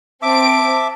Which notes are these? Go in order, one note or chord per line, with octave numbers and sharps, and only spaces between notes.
C4 E5 A5 D6 D7